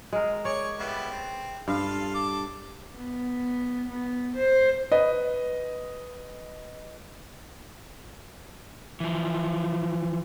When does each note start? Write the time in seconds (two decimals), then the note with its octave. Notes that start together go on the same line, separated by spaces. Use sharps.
0.13 G#3 A#4
0.45 G#4 C#5 D5 C#6
0.78 G3 B3 E4
1.10 C4
1.68 G2 F4 A4 F5
2.14 A4 D6
2.96 B3
3.89 B3
4.37 C5
4.91 B4 D#5
9.00 E3 F3